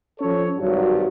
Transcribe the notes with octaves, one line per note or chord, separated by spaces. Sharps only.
F3 C#4 A4 C#5
G#1 G2 F#3